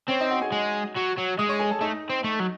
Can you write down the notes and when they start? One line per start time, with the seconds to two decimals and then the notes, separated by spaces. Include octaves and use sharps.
0.09 C4 C#4 C#5
0.20 D#4 D#5
0.30 F#4 F#5
0.42 G#4 G#5
0.52 G#3
0.96 F#3
1.17 F#3
1.38 G#3 D#5 D#6
1.49 C#5 C#6
1.59 G#4 G#5
1.71 A4 A5
1.81 A3 D#4 D#5
2.10 C4
2.24 A3
2.40 F#3